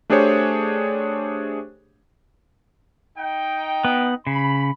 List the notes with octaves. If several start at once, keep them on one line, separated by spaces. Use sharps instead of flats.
A3 D4 G4 G#4 C5 C#5
D#4 G5
B3
C#3 B5